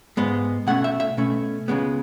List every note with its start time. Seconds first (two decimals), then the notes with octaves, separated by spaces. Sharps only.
0.17 G#2 G#3 B3
0.67 B2 A3 C#4 F#5
0.84 E5
1.00 E5
1.17 B2 A3 C#4
1.68 C#2 C#3 G#3 B3